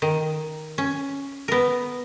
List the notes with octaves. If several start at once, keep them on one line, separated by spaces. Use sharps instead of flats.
D#3
C#4
B3 A#4